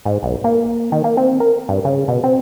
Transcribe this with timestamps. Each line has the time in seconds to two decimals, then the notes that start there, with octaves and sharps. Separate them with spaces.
0.05 G#2
0.23 B1
0.44 A#3
0.92 D#3
1.04 A#3
1.17 C4
1.40 A#4
1.69 G2
1.85 C#3
2.08 B2
2.24 C4